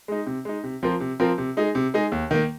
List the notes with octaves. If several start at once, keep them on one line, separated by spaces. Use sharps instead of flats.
G#3 D#4
C3
G#3 D#4
C3
F3 C4 F4 A#4
C3
F3 C4 F4 A#4
C3
G#3 D#4 G#4
C3
G#3 D#4 G#4
D#2
D#3 A#3